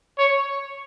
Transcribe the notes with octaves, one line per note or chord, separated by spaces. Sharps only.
C#5